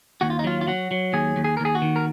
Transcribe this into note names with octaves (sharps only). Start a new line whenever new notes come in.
D#2 F#4
F4
D#4
F#3 F4
F4
F#3 F#4
F#3
D#2 G#4
D#2
G#4
A#4
D#2
G#4
F#4
D#3
A#4